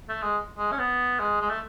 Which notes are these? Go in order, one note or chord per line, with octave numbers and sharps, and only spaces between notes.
A3
G#3
G#3
C#4
B3
G#3
G#3
A3